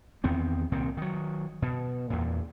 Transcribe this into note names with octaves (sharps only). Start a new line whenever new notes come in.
E2 D#3 B3 C4
C2 A#2 D#3 C4
D#3 F#3
B2
E2 A#2